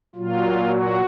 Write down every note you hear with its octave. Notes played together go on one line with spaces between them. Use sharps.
A#2 F#3 F4
F#4